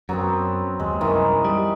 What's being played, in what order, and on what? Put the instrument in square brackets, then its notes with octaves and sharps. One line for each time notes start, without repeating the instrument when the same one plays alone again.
[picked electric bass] F#2 [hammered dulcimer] F#3 B3 C4
[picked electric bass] D#2 [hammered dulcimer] G#3
[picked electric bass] C2 F#2 [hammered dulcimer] D#3 E3
[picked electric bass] G3